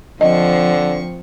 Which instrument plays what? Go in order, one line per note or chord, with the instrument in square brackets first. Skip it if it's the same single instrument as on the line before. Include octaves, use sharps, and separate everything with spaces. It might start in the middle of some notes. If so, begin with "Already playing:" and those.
[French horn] D3 [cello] F3 [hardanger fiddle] C4 C#6 [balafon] D#5